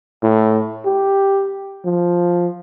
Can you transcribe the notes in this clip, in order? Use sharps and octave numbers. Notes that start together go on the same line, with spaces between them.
A2
G4
F3